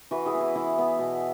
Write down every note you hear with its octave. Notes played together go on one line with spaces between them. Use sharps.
E3 F#4 B4
E4 G#4
B3
E4
E3 E4
B3
B2